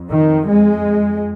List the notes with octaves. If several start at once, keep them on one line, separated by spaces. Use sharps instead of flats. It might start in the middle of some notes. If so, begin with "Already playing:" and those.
Already playing: F2
D#3
G#3